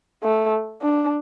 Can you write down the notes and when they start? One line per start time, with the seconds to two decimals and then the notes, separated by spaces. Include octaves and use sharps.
0.24 A3
0.82 D4